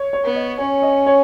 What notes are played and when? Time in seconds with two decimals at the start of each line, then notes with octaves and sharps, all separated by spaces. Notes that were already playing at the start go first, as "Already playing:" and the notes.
Already playing: C#5
0.13 C#5
0.24 B3
0.35 D#5
0.59 C#4 C#5
0.82 D#5
1.07 C#5